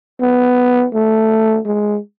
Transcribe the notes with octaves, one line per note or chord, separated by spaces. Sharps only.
B3
A3
G#3